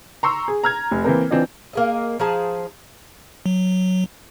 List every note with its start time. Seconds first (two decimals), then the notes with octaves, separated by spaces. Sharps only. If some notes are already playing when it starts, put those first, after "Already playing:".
0.23 A#5 C6 C#6 E6
0.48 G#4
0.64 A#5 F6 G#6
0.91 F1
1.04 E3 A#3 C4 A#4
1.31 E3 C4 D4 F4 D#5
1.73 A#3 G#4 D#5
2.19 F3 D#4 G#4 A5
3.46 F#3